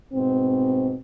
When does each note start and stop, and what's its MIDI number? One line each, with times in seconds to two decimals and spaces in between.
0.14 0.96 44
0.14 0.96 47
0.14 0.96 60